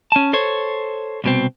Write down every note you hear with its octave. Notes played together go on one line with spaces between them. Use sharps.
C#4 A5
A4 C5 C#5
C2 B2 C4